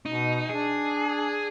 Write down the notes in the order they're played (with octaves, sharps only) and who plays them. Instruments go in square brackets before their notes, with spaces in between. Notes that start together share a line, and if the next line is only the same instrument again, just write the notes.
[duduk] B2 [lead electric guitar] D#4
[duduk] D4 [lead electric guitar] G#4